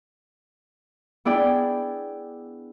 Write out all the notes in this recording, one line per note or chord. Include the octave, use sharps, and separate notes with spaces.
B3 D4 E4 G#4 D5 G5